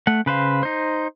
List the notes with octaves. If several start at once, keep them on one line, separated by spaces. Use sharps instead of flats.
A3 F#5
C#3 B4 C5 F5
D#4 C5